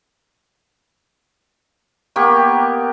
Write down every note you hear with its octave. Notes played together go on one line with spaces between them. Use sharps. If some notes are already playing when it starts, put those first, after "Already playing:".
A#3 B3 G4 C#6